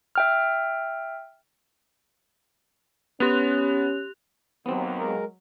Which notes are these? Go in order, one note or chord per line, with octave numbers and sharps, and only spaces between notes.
E5 G5 F6
B3 C#4 G4 F#6 F7
D#2 F#3 B3 C4
G#3 A#4